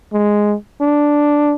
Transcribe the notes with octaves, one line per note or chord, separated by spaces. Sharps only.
G#3
D4